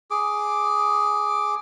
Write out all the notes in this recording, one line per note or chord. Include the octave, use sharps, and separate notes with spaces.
G#4 D6